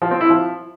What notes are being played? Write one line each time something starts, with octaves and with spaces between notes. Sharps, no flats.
F3
C4
E4
F3